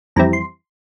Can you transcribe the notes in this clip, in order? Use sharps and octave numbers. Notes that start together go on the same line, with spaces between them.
F2 E3 G3 C4 E4 A#5
C6